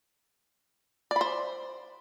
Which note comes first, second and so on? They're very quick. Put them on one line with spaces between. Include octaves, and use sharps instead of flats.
D5 B5 C5